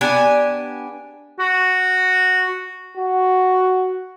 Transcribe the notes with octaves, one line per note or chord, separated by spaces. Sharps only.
B3 D4 G4 G#5
F#4
F#4